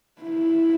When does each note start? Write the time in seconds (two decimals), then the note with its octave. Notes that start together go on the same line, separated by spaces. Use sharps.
0.22 E4